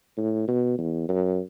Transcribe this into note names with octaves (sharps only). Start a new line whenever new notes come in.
A2
B2
E2
F#2